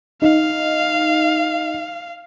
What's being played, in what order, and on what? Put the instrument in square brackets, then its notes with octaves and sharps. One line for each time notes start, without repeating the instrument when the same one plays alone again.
[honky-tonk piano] D#4 [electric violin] F5